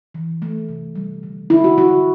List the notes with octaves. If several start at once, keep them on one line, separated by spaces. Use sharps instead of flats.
E3
A3
C3
G3
D3
D3 E4
F#4
D3 F#4